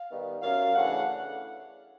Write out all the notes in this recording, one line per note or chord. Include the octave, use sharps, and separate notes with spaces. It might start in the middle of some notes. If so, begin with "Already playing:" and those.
Already playing: F5
D#3 G3 B3
F#2 F5
C#3 E3 A3 D4 F#5